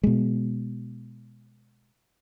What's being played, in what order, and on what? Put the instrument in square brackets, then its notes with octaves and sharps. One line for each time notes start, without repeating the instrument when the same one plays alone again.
[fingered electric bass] B2 G#3